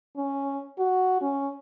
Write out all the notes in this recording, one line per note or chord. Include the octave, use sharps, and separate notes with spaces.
C#4
F#4
C#4